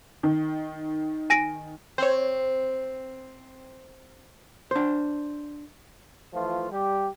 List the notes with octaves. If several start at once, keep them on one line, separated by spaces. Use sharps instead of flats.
D#3
G#5 A#6 D7
C4 C5 C#5
D4 C5
E3 F3 A3 F4
G3 G4